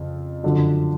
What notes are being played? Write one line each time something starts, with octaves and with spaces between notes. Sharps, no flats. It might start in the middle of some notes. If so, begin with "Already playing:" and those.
Already playing: F2 C#3
F#2 D3 F3